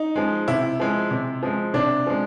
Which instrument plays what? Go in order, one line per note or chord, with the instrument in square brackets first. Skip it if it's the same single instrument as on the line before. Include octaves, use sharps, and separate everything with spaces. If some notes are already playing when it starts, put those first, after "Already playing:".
Already playing: [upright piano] D#4
F3 G#3
C3 E4
F3 G#3
C3
F3 G#3
C3 D4
F3 G#3